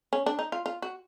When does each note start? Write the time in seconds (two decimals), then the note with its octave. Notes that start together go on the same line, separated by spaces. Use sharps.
0.13 C#4
0.26 D4
0.39 D#4
0.52 F4
0.66 F4
0.82 F#4